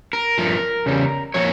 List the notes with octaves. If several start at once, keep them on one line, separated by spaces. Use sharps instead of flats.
A#4
G2 F3 A3
E2 C#3 G3
A#2 F3 A#3 C#5